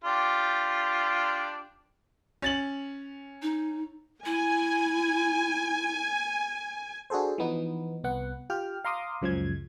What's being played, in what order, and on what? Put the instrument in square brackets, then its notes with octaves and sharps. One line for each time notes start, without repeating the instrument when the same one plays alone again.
[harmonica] D4 F4 G4
[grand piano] C#4 A6 F#7
[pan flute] D#4
[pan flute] E4 [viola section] G#5
[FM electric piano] D4 F#4 G#4 A4 C5
E3 F3 B3 D#4
C2 B3 F#5
F4 G4 G5 F6
F5 A#5 C6 D6 D#6
C#2 F#2 C#3 F3 G#3 G#6